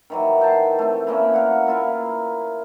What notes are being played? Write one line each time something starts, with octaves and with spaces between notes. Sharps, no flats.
D#3 E3 F#3
G5 A5 C6
A3 C4
E3 A#3 C#4
A#4 F5 F#5
A#3 E4 F4 A#4